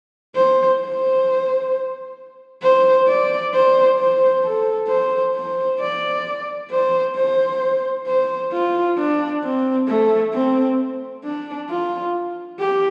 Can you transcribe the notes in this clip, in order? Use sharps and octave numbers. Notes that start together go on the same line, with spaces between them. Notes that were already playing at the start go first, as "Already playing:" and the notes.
C5
C5
C5
D5
C5
C5
A4
C5
C5
D5
C5
C5
C5
F4
D4
C4
A3
C4
D4
F4
G4